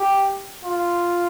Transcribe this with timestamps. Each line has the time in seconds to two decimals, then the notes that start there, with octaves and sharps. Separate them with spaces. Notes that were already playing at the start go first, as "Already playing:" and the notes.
Already playing: G4
0.63 F4